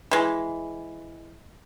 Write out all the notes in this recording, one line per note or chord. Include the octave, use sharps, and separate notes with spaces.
E3 G#3